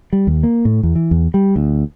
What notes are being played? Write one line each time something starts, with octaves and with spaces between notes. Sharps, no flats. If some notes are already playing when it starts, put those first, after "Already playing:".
G3
D#2
A#3
A2
E2
E3
E2
G3
D2